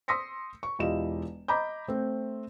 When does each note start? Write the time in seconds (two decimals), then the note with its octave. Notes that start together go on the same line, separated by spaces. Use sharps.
0.08 C6 D#6 E6 A#6 B6 C#7
0.63 C#6
0.79 E1 E4 F4 G4 D#5 E7
1.48 D#5 A#5 B5 D6 G6
1.88 A3 C4